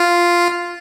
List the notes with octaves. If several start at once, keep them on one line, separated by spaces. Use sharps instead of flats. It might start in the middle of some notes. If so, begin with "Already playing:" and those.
Already playing: F4